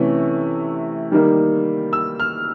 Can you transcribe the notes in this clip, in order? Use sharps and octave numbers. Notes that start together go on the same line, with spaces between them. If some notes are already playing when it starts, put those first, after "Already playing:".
Already playing: C3 E3 A3 C#4
D#3 G3 A#3 D#4
E6
F6